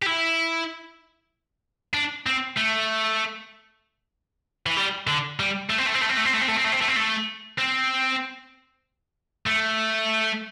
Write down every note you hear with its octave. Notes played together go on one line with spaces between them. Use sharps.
G4
E4
D4
C4
A3
E3
G3
D3
G3
A3
C4
A3
C4
A3
C4
A3
C4
A3
C4
A3
C4
A3
C4
A3
C4
A3
C4
A3